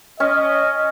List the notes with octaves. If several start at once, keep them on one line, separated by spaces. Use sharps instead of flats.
C#4 D#5